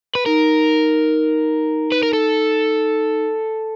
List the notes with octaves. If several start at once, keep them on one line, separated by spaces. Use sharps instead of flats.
B4
D#4 A#4
B4
A#4
A4